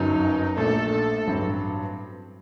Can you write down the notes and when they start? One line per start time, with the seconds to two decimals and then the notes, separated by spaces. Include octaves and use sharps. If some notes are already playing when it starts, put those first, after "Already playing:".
Already playing: G1 F#2 F#3 D#4
0.56 A#1 A#2 A3 D4 A4
0.92 A4
1.27 A1 G2 F#3 C4